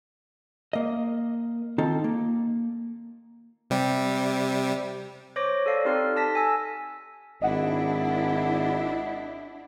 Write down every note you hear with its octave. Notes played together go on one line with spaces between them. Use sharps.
A#3 D#5
D#3 C4 D#4 F4 A4
A#3
C3 G3
C5 C#5 D6 A#6
A4 D5 F5
C4 D#4 G4 A4 C6 F6
A4 A5 A#6 B6
G#5 E6
G#1 D4 E4 D#5 F#5